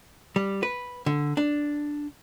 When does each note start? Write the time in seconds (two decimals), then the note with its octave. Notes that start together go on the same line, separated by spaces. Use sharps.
0.36 G3
0.63 B4
1.06 D3
1.37 D4